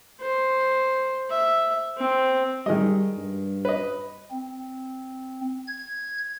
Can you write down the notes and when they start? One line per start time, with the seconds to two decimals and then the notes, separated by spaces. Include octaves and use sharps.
0.20 C5
1.30 E5
1.97 C4
2.66 D#3 G3 G#3 D#5
3.17 G2
3.65 B4 D#5
4.31 C4
5.67 G#6